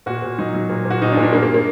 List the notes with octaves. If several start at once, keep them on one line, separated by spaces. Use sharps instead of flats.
A#2 F#4
A#2
F#3 D#4
F#3
A#2
A#2
F#4
A#2 D#4
D4
A#2
D4
G2 A#3
A#3
A#3